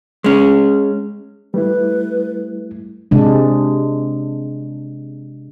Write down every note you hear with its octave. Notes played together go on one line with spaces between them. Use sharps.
G#3 C#4
G3 A3 E4 B4
C3 G#3 D4